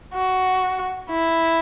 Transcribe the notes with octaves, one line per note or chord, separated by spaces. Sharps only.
F#4
E4